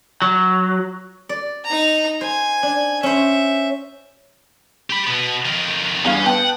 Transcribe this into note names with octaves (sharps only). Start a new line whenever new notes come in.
F#3
D5
D#4 A#5
C5 G#5
D4
C#4 C5 E5
G4 B5
B2 B3
F2 D#3
E2 G2 C#4 F5
B3 F#5 G5 A5